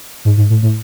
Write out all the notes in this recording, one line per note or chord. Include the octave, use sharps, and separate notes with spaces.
G#2
G#2
A2
A2